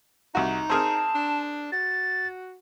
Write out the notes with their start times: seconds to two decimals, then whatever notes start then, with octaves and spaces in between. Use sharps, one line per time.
0.35 C2 D#4 F#4
0.70 C4 G#4 A#4 A5
1.15 D4
1.72 F#4 A6